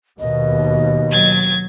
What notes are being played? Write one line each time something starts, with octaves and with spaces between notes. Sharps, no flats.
D#2 B2 D#5
F#3 G#6 A6